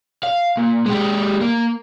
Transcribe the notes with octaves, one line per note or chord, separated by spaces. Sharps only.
F5
A#2
G#3 G4
A#3